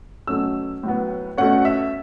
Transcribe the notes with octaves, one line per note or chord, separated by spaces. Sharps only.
B2 F#3 A3 C#4 E6
A2 F#3 B3
B2 A3 C#4 F#5
E5